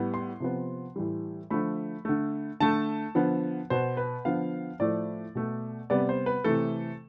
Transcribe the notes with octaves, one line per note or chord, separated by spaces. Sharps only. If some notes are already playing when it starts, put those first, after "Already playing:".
Already playing: A2 G3 B3
C6
C3 F3 B3
A2 E3 G3
D3 F3 A3 B5
D3 A3
D3 A3 A5
D3 F3 B3
B2 B3 C5
B4
D3 F3 B3 F5
A2 F3 A3 D5
B2 A3
C3 G3 B3 D5
C5
B4
C3 E3 A3 A4